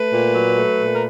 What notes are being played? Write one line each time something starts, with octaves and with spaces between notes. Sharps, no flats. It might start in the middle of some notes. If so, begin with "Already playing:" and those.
Already playing: A3 B4
A#2
F#3
A3
A#2
A#4